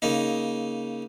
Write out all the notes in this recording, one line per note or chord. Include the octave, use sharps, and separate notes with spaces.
C#3 A#3 D#4